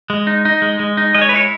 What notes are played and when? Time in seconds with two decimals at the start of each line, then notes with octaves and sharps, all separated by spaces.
0.10 G#3
0.27 D#4
0.45 D#4
0.62 G#3
0.80 G#3
0.97 D#4
1.15 G#3 D#5
1.22 C#5
1.29 B4
1.32 E4 C#5